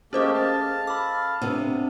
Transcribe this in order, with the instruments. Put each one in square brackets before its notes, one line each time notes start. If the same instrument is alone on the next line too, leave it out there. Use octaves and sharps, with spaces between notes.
[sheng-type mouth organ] A3 A#3 G4 [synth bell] C#4 C5 D#5 [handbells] G#4
[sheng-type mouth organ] F5 A5
[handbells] A4 B5 [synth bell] D6
[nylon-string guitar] C3 B3 [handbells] D4